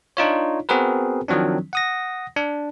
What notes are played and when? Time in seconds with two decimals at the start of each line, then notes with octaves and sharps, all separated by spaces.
0.17 D4 D#4 F4 C#5
0.69 B3 C4 F#4 G#4 A#4 B4
1.28 D#3 F3 F#3 C4 D4
1.73 F#5 D#6 A#6
2.36 D4